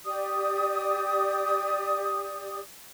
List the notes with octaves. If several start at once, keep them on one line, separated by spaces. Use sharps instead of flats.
G4 D5 D#6